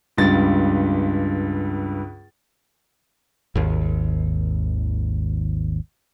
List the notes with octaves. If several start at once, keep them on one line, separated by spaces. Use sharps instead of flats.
C#2 G2 A6
G#1 D#2